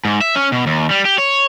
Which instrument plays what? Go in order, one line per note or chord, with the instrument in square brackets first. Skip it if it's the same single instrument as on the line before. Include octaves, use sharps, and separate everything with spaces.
[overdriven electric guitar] G#2
E5
C#4
B2
D#2
G3
G4
C#5